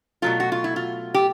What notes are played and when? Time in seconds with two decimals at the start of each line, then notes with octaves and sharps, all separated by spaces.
0.22 B2 F#3 A3 F4
0.40 F#4
0.52 F4
0.64 E4
0.76 F4
1.14 G4